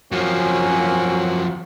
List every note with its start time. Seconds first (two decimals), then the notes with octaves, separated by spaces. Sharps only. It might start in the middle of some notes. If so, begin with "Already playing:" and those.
0.12 F#2 F3 A#3 C4 C#4 F#4